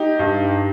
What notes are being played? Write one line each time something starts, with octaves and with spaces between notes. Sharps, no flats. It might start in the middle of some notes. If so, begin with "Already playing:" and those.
Already playing: D#4 G4
G2